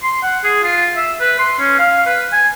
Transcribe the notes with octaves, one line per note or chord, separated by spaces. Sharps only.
C6
F#5
G#4
F4
E5
B4
C6
C#4
F5
B4
G#5